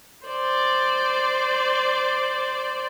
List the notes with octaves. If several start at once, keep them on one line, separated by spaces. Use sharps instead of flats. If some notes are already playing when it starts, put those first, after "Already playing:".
C5 D5